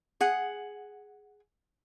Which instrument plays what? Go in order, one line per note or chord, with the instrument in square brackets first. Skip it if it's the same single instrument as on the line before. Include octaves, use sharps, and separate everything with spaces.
[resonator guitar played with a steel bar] G#4 F#5